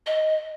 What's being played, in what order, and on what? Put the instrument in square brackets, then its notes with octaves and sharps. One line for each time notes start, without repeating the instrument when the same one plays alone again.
[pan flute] D#5